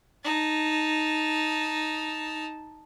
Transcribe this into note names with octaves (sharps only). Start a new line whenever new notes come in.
D#4 A5